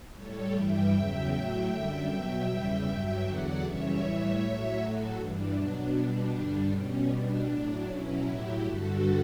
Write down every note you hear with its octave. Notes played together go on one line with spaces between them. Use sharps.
A2 G3 A4 C#5
G2 E3 G3 E5 G5
E2 C#3 F#3 E5 G5
A2 F#3
F#2 D3 G3
B2 F#3 E5 G5
E2 C#3 G3
G2 F#3
E2 D3 F#3 D5 F#5
F#2 C#3 E3 G3 C#5 E5
A2 E3 G3
A2 F#3
A2 F#3 F#4 A4
G2 E3 G3 D4
B2 F#3
B2 G3
G2 D3 G3 D4
B2 G3 C#4
B2 G3 D4
A2 F#3
B2 F#3 C#4 E4
A2 F#3 E4 G4
G2 D3 G3 F#4 A4